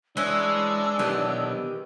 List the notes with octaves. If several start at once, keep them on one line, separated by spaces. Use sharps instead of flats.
E3 G#3 C#4 D4 E6
B1 D#3 E3 G4